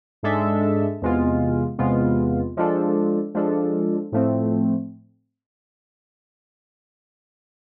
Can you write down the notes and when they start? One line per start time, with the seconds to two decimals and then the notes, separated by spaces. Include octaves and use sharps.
0.23 G#2 G#3 D4 A4 E5
1.02 E2 C3 G#3 B3 F4
1.78 E2 C3 G#3 B3 F4
2.57 F3 G#3 D4 F4 A4
3.34 F3 G#3 D4 F4 A4
4.12 A2 F3 A3 C4